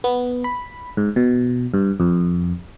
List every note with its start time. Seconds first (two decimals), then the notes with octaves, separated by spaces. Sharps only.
0.04 B3
0.44 B5
0.97 G#2
1.16 B2
1.74 G2
2.00 F2